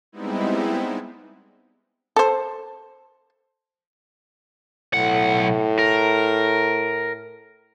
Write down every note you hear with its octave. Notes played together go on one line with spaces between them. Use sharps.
G3 G#3 B3 C4 D#4 E4
A4 C5
B1 A2 F#5
A#4